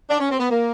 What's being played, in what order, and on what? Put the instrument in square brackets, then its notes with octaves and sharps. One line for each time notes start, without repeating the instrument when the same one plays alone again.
[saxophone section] D4
C#4
C4
B3
A#3